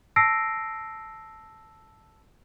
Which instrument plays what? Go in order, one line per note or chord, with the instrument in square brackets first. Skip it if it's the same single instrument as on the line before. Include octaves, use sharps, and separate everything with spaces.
[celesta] A5 E6 A#6 C7 D7